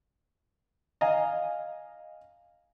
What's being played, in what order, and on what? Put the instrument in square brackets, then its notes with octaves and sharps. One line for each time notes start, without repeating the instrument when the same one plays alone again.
[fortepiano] D#5 F5 G#5 A#5